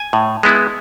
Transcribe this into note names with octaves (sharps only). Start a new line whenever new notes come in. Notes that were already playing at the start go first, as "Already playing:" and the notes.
Already playing: G#5
A2
G#3 B3 E4